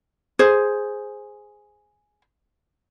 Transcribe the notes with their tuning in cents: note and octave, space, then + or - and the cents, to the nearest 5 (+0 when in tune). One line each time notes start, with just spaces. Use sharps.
G#4 +0 C5 +0